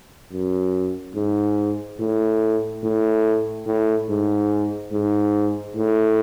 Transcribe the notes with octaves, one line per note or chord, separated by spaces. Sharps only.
F#2
G#2
A2
A2
A2
G#2
G#2
A2